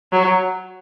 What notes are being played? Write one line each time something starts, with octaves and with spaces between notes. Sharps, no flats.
F#3